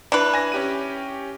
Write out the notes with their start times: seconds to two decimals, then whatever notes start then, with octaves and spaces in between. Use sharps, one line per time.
0.12 E3 D4 B4
0.34 G#5 A#6
0.52 C#4 G4 D#7